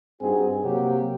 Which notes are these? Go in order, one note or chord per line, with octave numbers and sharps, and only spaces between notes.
G2 C4 D#4 F#4 G#4 G#5
C3 F#3 A#3 C4 G4